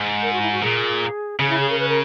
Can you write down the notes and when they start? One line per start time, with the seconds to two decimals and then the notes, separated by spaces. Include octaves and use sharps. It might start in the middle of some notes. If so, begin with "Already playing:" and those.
Already playing: G#2
0.22 A#4
0.33 F#4
0.42 E4
0.52 F#4
0.62 A#2 G#4
1.39 C#3 G#4
1.49 E4
1.59 G#4
1.70 A#4
1.79 B4
1.89 A#4